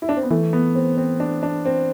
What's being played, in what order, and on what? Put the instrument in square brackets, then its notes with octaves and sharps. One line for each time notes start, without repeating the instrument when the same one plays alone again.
[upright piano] E4
D4
C4
B3
[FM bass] E3 [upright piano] A3
[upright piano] B3
C4
C4
D4
D4
C4